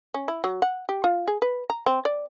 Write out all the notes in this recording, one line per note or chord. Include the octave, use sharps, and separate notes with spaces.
C#4
E4
F#3
F#5
G4
F4
G#4
B4
A#5
C4
D5